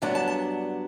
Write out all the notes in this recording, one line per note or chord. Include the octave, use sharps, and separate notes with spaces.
G2 D3 F#3 B3 D4 A5
A5
A5